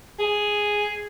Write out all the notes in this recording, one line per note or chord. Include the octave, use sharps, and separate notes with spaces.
G#4